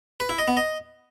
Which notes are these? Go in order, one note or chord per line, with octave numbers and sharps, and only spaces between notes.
B4
E4
D#5
B3
D#5